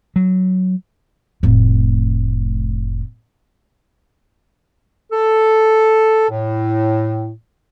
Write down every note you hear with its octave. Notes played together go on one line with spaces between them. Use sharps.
F#3
F1 A2
A4
A2